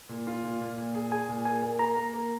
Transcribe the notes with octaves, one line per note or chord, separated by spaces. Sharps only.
A#2
F4
A#2
A#2
A#2
G#4
G#4 G#5
A#2
A#3 G#5
A#3
A#3 A#5
A#3
A#3